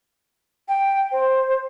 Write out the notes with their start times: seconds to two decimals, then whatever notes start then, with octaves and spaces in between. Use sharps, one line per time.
0.69 G5
1.12 C5